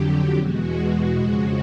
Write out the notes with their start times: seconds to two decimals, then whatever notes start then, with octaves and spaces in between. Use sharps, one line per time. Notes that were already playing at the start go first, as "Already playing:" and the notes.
Already playing: F2 D3 F#3 G4
0.35 E2 B2 G#3 F#4
1.18 F2 C#3 F3 G#3 F#4